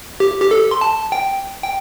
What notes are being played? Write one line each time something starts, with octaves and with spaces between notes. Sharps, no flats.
G4
G4
A4
C6
A5
G5
G5